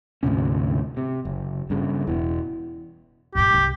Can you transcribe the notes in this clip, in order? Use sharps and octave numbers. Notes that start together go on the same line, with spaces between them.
D2 G#2 C3 C#4
C3
F#1
G2 C#3
E1 E2 E3
G2 A#2 G4
C2 G#3